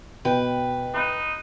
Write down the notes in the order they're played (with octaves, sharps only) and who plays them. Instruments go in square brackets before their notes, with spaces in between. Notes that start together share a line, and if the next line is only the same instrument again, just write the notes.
[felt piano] B2 [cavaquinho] B4 G5
[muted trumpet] D#4 [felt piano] B5 F#6